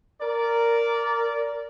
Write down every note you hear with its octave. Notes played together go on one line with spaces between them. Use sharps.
A#4 D5